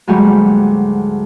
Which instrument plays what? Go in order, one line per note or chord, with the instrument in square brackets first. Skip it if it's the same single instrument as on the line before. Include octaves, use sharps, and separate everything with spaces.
[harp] D2 G#2 F#3 G3 A#3